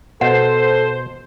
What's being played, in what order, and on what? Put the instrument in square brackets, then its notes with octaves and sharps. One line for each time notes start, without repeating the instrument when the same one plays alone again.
[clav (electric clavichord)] B2 [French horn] A4 [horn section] C5 [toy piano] F#5